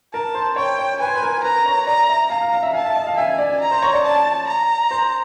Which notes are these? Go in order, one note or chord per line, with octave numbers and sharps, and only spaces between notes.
A#4 A5
C5
C#5 G5
C#5
B4 G#5
C5
B4
A#4
B4 A#5
C#5
D5 A#5
E5
F5 A#5
F5
F5
E5
F5 A5
E5
D#5
F5
E5 G#5
D5
A#5
C5
C#5
D5
C#5 A5
A#5
C5